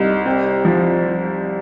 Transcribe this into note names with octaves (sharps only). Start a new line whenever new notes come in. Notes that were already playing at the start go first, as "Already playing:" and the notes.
Already playing: C2 D#4
C4
F3